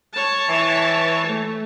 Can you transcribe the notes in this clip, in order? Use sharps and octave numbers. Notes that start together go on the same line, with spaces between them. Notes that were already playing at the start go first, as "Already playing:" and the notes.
C#5 A5
E3
A3